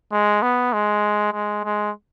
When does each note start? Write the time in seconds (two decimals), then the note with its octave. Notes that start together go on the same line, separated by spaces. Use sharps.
0.12 G#3
0.42 B3
0.73 G#3
1.33 G#3
1.64 G#3